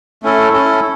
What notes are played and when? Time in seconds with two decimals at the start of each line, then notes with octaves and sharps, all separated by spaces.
0.23 A3 C#4 E4 A4
0.53 C#4 E4 A4